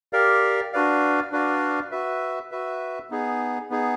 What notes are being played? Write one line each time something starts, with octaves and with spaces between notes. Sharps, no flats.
G4 A#4 D5 F5
D4 F#4 B4 D5 F5
D4 F#4 B4 D5 F5
F#4 B4 E5
F#4 B4 E5
B3 D#4 G#4
B3 D#4 G#4